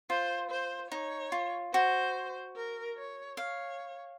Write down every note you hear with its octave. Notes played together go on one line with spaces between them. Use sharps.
F4 C5
C5
D#4 C#5
F4
F#4 C5
A#4
C#5
C#5 F5